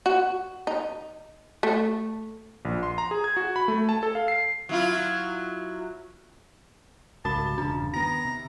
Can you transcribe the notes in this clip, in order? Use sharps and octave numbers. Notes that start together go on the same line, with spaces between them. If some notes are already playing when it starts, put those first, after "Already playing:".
F#4
D#4
A3
A#1
C6
A#5
G#4
G#6
F#4
B5
A3
A5
A4
F5
C7
F#3 E4 F4
C2 G#2 C#3 F#4 A5 B5
E1 G2 C#3 D4
D#3 B3 A#5 A#6
C3